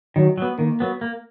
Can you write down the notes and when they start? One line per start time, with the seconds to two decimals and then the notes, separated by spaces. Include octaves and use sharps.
0.16 D#3 F#3
0.38 F#3 B3
0.58 D#3 A#3
0.80 F#3 B3
1.01 A#3